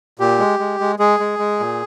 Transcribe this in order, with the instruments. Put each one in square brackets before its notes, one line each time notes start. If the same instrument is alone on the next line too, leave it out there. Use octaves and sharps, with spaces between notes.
[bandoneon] A#2 G4
G#3
G#3
G#3
G#3 G#4
G#3
G#3
A#2